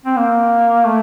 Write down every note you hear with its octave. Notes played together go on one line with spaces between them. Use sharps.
C4
A#3
A3